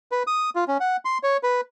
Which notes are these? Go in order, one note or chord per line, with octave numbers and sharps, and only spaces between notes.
B4
D#6
F4
C#4
F#5
C6
C#5
B4